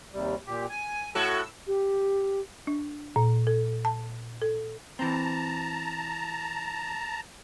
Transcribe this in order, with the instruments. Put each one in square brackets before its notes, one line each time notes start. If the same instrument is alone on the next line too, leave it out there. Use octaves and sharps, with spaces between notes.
[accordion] D#2 C3 G3
A#2 G4
G#5
[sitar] A2 F#4 A4 [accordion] E6
[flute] G4
[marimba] D4
A#2
A4
A5
A4
[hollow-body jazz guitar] E3 C4 [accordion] A5 A#5